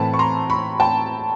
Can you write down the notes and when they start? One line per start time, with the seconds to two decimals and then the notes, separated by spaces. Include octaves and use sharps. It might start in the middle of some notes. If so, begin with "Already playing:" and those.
Already playing: A2 E3 A3 C4 A5 B5
0.14 C#6
0.19 A#5 C6
0.50 B5 C#6
0.80 G5 A5